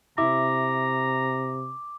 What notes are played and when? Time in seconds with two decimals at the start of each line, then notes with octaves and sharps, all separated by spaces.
0.18 C3 E4 A#5 D6